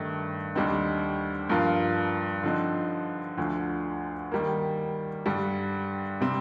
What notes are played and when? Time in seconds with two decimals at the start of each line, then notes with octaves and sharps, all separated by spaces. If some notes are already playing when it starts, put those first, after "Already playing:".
Already playing: G2 D#3 A3
0.55 D#2 D3 G3 C4 D#4
1.49 G2 F3 A#3 F4 A#4
2.43 D3 F3 C4 D#4
3.37 D2 D3 F3
4.32 D#3 G3 A#3
5.26 G2 D3 G3
6.21 C3 G3 C4